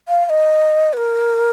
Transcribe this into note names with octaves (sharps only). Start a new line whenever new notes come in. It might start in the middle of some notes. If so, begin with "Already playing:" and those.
F5
F5
D#5
B4
A#4